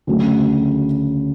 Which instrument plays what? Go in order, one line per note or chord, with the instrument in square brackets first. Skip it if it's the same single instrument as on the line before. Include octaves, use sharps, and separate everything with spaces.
[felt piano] D2 C#3 F#3